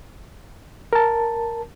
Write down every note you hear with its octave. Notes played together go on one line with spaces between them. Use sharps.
A#4 A5